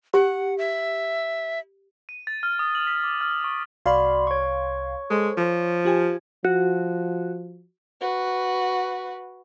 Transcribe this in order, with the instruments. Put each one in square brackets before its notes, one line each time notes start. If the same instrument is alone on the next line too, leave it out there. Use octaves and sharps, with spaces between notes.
[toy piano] G4 [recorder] F#5
[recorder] E5
[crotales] D#7
A6
F6
D#6
F#7
B6
D6
F6
C#6
[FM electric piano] C2 F5 C6 [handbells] F#4 D5 B5
[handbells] C#5 C#6
[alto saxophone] G#3 [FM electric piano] A4 C5
[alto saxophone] F3
[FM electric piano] F4 G4 G#5
[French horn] F3 [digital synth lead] F#4
[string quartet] F#4 B4